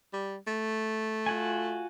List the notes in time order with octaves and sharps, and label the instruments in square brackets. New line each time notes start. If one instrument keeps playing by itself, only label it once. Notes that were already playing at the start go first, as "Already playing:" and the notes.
[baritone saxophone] G3
A3
[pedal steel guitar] F4 F#4 G#5